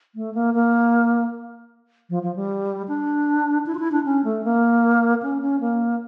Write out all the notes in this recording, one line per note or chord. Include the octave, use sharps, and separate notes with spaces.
A3
A#3
A#3
F3
F3
G3
D4
E4
F4
E4
D4
C#4
A3
A#3
C#4
C#4
A#3